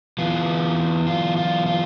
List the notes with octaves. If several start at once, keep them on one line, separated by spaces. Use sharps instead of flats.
E3 B3 F4
F4
F4
F4